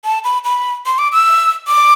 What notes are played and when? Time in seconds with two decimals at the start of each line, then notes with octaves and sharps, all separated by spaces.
0.04 A5
0.24 B5
0.44 B5
0.86 C6
0.98 D6
1.12 E6
1.67 D6